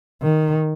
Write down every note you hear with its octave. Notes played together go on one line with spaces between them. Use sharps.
D#3